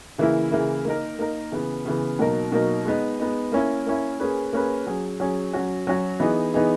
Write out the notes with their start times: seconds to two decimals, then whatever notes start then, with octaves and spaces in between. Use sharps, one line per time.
0.18 C#3 E3 A#3 E4
0.51 C#3 E3 A#3 E4
0.85 A#3 D#4 A#4
1.19 A#3 D#4 A#4
1.52 C#3 E3 B3
1.85 C#3 E3 B3
2.19 B2 F#3 A#3 D#4 A#4
2.52 B2 F#3 A#3 D#4 A#4
2.85 G#3 B3 D#4
3.19 G#3 B3 D#4
3.52 A#3 C#4 E4
3.86 A#3 C#4 E4
4.20 A#3 C#4 G#4 B4
4.53 A#3 C#4 G#4 B4
4.86 F#3 C#4 G#4
5.20 F#3 C#4 G#4
5.53 F#3 C#4 F#4
5.87 F#3 C#4 F#4
6.20 E3 B3 D#4 G#4
6.54 E3 B3 D#4 G#4